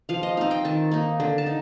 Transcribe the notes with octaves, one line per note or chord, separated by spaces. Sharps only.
F3 F5
D#5
C4 D#4 F5
G5
D#3 A5
A#3 D#4
D3
A5
D#4